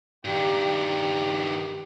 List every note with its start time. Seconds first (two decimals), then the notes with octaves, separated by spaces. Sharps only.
0.25 G2 D#3 G4
0.85 G4